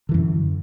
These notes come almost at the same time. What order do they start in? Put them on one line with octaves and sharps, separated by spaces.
D3 E3 F#2